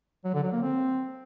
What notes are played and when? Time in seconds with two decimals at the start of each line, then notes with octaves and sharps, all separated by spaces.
0.25 F#3
0.34 D3
0.43 F#3
0.53 A#3
0.62 C4